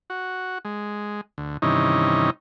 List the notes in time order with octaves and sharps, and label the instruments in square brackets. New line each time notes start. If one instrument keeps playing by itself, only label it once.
[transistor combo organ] F#4
G#3
D2
G2 C3 D#3 E3 C#4 D#4